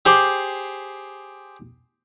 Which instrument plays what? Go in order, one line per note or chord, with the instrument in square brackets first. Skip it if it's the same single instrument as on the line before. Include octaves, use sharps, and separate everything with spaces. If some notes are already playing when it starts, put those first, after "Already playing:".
[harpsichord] G4 G#4 C5 C6 D6